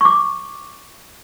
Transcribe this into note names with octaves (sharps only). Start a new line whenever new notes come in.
C#6 D6